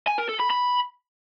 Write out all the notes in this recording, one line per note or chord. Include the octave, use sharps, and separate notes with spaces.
G#5
A#4
A4
B5
B5